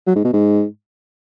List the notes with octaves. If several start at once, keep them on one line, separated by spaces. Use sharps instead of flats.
F#3
G#2
B2
G#2